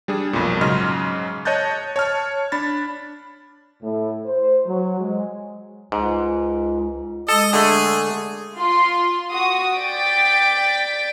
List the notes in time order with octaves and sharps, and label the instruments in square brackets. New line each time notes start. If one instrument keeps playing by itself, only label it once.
[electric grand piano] G3 D4 G#4
B1 F2 A#2
G#2 C#3 F#3 D#5 C6 F6
C#5 D#5 A5 F#6 G6 A6
C#5 A5 F6
D4 B5 A6
[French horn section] A2
C5
F#3
G#3
[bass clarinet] C#2 [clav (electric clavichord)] G#2
[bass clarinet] G#3 [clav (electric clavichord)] A4 [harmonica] D#5
[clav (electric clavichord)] D3 A3 [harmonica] G#4
[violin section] F4 C6
F#4 D#6
D5 G5 A6 B6 D7